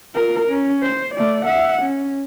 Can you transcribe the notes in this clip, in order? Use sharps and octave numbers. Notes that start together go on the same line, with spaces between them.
F4 A#4
C#4
C5
A3 D5
E5 F#5
C#4